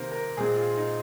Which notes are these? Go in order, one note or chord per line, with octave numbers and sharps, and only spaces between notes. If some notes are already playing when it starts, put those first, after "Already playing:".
Already playing: C3 D#3 A#3 A#4 C5
A#4
A#2 G#3 C4 G#4
F4
D#4